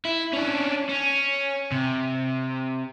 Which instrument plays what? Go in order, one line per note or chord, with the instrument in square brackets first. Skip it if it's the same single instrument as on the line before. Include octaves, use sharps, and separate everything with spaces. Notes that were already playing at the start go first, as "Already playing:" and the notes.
[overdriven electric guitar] E4
C#4 D4
C#4
C3